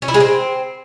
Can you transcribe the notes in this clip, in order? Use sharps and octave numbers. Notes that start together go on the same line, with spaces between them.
C#4
E4
G#3
C4